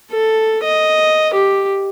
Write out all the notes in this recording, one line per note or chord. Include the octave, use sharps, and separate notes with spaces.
A4
D#5
G4